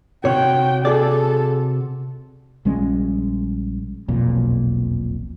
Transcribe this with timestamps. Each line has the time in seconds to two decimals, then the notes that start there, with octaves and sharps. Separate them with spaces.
0.25 C3 F#4 C#5 G5
0.85 G#4 A4 D5
2.65 A#1 G3 G#3 C#4
4.08 E1 B1 F2 A#2